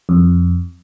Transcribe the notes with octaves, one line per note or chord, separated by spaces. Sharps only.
F2